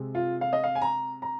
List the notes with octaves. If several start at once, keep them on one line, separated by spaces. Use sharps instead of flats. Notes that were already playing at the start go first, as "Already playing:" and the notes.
Already playing: C3 G#3 C4
F4
F5
D#5
F5
G#5
A#5
A#5